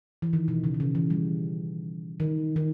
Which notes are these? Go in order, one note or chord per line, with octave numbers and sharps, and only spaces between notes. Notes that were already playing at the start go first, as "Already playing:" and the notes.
E3
D#3
B2
C#3
D#3
C#3
E3
G3
D#3
D#3